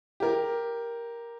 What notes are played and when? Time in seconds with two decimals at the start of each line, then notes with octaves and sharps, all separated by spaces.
0.20 G4 A#4